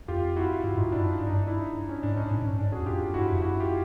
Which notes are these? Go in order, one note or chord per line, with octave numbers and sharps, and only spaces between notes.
F2 F4 G4
E4 F#4
G2 E4 F#4
G#2 D#4 F4
G2
F#2 D4 E4
G2 D4
D#4
D4
D4 E4
D4
C#4
G#2 D4
C#4 D#4
A2 D4
G#2 C#4
G2
G#2 D4
F#4 G#4
E2
F2 F4 G4
G2 E4 F#4
F#2
F2
F#2 E4 F#4
F4 G4